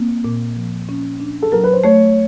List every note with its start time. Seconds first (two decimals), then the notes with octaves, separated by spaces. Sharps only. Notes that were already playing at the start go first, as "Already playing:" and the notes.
Already playing: A#3 C4
0.25 A#2
0.56 F3
0.89 C#4
1.20 D4
1.42 A4
1.52 F#3 A#4
1.63 B4
1.73 C5
1.84 A3 C#5